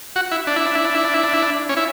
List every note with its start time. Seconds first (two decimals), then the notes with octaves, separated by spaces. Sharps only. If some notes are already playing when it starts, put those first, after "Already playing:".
0.16 F#4
0.32 E4
0.47 D4
0.56 E4
0.66 D4
0.75 E4
0.85 D4
0.94 E4
1.04 D4
1.14 E4
1.24 D4
1.33 E4
1.42 D4
1.69 C#4
1.77 E4